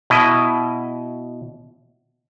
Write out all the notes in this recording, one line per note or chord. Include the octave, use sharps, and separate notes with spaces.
B2 E4 D#5